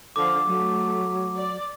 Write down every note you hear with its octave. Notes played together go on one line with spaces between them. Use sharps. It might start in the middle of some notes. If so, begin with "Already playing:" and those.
D3 F3 F5 D6
F#3 A3
D5